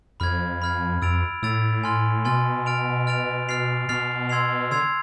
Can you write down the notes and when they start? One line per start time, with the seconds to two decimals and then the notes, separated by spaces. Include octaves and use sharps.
0.20 F2 B5 F6 G#6
0.62 B5 F6 G#6
1.02 F2 E6 A6 D7 F7
1.42 A2 E6 A6 D7 F7
1.84 G#5 C6 F6 A6
2.25 B2 G#5 C6 F6 A6
2.66 F6 A6 D7 F7
3.07 F6 A6 D7 F7
3.49 F6 A6 C7 F7
3.89 B2 F6 A6 C7 F7
4.29 C6 E6 G#6 C7 F7
4.71 D3 C6 E6 G#6 C7 F7